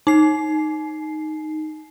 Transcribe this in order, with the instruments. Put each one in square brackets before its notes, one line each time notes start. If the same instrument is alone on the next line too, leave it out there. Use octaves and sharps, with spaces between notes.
[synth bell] D#4 C7